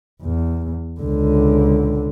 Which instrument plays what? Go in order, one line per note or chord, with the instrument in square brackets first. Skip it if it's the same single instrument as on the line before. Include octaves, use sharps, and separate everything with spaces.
[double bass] E2
C#2 D3